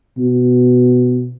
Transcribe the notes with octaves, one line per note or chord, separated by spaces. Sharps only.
B2